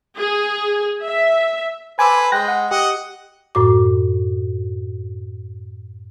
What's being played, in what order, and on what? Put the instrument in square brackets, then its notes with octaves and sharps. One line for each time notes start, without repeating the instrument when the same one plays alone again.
[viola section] G#4
E5
[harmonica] A4 B4 C5 [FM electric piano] G#5 D6 E6
[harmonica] G#3 [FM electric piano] G5 F#6 A#6
[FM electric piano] F#5
[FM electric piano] G4 [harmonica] D#5 F#5
[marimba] F#2 A2 F#4 D6